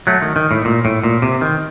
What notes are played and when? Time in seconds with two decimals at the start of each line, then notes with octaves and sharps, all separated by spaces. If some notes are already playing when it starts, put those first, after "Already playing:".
0.07 F#3 A3
0.22 D#3
0.36 D#3
0.51 A2
0.65 A#2
0.85 A2
1.03 A#2
1.22 C3
1.41 D#3